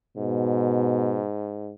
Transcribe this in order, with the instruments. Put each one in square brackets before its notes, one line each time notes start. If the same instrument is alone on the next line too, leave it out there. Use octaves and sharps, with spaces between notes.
[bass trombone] G#2 [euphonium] B2